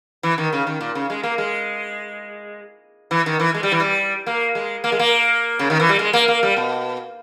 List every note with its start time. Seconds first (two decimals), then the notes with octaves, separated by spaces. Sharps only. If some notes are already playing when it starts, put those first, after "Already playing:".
0.23 E3
0.38 D#3
0.53 C#3
0.67 D#3
0.81 A#2
0.95 C#3
1.10 G#3
1.23 A#3
1.38 G#3
3.11 E3
3.26 D#3
3.40 E3
3.54 G#3
3.63 G3
3.72 E3
3.80 G3
4.27 A#3
4.55 G#3
4.84 A#3
4.92 G#3
4.99 A#3
5.59 C#3
5.70 D#3
5.80 E3
5.89 G3
5.99 G#3
6.13 A#3
6.28 A#3
6.43 G3
6.57 B2